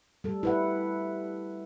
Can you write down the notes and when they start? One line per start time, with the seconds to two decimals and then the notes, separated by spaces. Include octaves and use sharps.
0.24 G3 A4
0.43 E4 B4 F#5